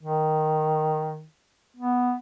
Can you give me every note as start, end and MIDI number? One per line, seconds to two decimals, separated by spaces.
0.03 1.26 51
1.77 2.15 59